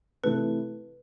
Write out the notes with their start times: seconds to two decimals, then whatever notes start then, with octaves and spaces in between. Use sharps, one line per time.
0.23 C3 E3 A3 E4 A4 B4